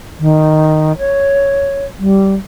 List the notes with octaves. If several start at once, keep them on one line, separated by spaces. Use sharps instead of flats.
D#3
C#5
G3